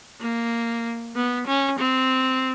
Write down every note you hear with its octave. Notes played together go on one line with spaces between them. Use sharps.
A#3
B3
C#4
C4